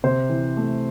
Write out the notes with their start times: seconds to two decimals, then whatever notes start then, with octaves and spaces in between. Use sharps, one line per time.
0.04 C3 C5
0.30 E3
0.57 A3